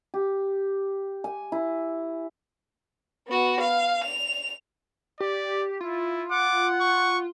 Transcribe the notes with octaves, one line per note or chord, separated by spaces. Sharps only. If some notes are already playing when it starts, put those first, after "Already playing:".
G4
G#5
E4
B3 F#4
F5
F7
G4 D5
E4 F4
F#5 D6
C#6